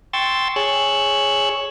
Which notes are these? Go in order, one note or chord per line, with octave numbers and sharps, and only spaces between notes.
G5 C6 C#6 E6 A6
G#4 C#5 C#6 E6 F#6